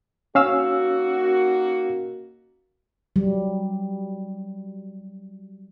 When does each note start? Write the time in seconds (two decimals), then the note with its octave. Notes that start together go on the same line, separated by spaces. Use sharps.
0.35 A#3 C#4 D#4 F#4 F5 E6
3.16 F#3 G3